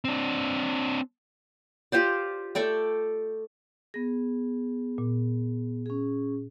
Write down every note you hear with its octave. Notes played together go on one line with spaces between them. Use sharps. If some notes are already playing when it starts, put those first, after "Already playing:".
C4 D4
F4 G4 C5 D5
A3 A4 D5 G5
B3 G#4 A#6
A#2
C#4 G#4